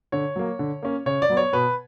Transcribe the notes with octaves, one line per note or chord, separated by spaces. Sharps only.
D3 C#5
F#3 A#3
D3
A#3 C#4
C#3 C#5
D5
F#3 B3
C#5
B2 B4